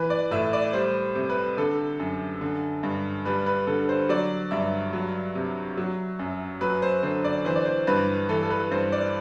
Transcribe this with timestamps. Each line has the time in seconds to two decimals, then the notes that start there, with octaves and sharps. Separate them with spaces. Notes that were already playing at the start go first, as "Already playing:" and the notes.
Already playing: E3 B4
0.10 D5
0.31 A2 E5
0.53 D5
0.73 G3 C5
1.15 C3
1.30 B4
1.57 D3 A4
2.00 F#2
2.41 D3
2.83 G2
3.25 G3 B4
3.46 B4
3.67 D3 A4
3.89 C5
4.09 F#3 D5
4.51 G2 E5
4.93 F#3
5.35 C3
5.77 F#3
6.19 F#2
6.61 F#3 B4
6.82 C5
7.03 D3 C5
7.24 D5
7.45 E3 C5
7.56 D5
7.65 C5
7.87 G2 B4
8.29 E3 A4
8.43 A4
8.50 B4
8.71 G2 C5
8.92 D5